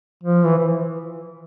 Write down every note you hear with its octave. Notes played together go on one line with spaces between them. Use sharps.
F3
E3
E3